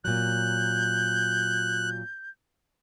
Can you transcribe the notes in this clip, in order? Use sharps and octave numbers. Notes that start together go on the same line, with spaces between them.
A#2 F#3 F#6 G6